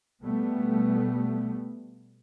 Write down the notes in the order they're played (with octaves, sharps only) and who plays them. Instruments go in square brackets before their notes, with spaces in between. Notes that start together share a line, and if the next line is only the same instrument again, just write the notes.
[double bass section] B2 G3 A3 B3